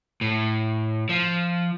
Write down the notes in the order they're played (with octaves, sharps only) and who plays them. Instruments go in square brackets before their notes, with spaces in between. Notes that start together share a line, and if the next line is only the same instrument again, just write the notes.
[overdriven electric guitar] A2
F3